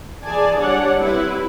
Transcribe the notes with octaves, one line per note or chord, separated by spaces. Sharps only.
E3 G#4 D5 G#5 A5
G3 D4 C#5 D5 F#5
C4 E4 G4 B4